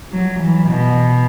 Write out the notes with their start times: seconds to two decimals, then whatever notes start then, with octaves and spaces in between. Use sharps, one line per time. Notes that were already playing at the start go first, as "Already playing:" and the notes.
0.12 F#3
0.40 E3
0.69 B2